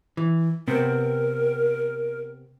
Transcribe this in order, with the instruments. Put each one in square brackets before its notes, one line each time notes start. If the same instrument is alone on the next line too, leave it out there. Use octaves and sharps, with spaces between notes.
[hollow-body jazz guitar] E3
[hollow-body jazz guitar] C3 B3 C4 [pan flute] A#4